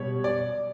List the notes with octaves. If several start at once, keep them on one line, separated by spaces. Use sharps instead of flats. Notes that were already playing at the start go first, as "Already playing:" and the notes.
Already playing: B2 G3 C#5
D5